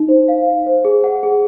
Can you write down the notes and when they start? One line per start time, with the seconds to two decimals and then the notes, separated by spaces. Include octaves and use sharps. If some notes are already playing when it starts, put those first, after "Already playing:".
Already playing: D#4
0.08 C5
0.28 F5
0.46 F5
0.66 C5
0.85 G#4
1.04 F#5
1.23 G#4